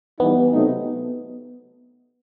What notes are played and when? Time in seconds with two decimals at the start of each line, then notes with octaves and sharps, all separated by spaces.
0.20 E3 G3 B3 D#4
0.52 C3 F#3 A3 D#4